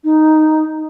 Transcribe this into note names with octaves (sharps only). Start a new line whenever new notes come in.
D#4